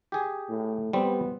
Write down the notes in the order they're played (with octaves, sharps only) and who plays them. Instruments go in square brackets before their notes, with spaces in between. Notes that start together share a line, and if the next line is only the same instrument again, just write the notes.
[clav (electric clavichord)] G4 G#4
[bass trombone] A2
[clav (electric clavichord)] G3 C4 [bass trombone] B3